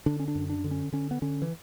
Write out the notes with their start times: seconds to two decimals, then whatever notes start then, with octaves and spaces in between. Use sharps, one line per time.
0.06 D3 D4
0.20 C#4
0.28 D4
0.35 F#2
0.49 D4
0.64 D3
0.71 C#4
0.93 D3 C#4
1.11 B3
1.22 D3 C#4
1.42 E3